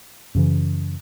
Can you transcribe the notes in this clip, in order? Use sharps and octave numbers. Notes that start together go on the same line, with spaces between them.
F#2 C#3 E3